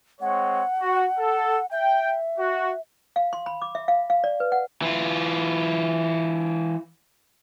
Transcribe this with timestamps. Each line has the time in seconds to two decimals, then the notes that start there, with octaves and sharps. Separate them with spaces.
0.21 G#3 C4 C#5 F#5
0.80 F#4
1.18 A4
1.71 E5 G5
2.39 F#4
3.16 F5
3.33 C6
3.46 B5
3.62 D6
3.75 E5
3.88 F5
4.10 F5
4.24 D5
4.40 B4
4.52 F#5
4.82 E3 F4